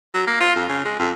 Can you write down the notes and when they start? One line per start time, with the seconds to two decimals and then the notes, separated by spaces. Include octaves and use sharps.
0.14 F#3
0.27 A#3
0.40 F4
0.56 F2
0.69 C#3
0.85 G#3
0.99 F2